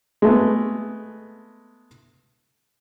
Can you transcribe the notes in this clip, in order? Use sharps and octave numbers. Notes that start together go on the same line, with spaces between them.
G#3 A3 B3